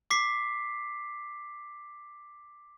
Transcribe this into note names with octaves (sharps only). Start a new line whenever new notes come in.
D6 B6 C7